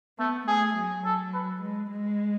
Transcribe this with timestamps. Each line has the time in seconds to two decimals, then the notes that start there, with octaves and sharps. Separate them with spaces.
0.19 A3 B3
0.47 A3 G#4
0.77 F#3
1.05 F#3 A4
1.33 B4
1.61 G#3
1.91 G#3